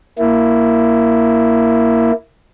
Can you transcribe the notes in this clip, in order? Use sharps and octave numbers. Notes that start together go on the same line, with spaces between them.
A#3 E4